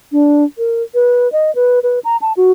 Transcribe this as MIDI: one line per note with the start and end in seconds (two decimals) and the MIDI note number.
0.12 0.44 62
0.58 0.82 70
0.94 1.31 71
1.32 1.54 75
1.55 1.79 71
1.83 1.99 71
2.04 2.17 82
2.21 2.33 81
2.37 2.51 66